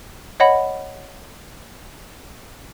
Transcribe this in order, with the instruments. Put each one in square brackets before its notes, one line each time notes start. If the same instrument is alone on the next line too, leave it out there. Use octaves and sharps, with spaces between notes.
[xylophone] C#5 D#5 F#5 B5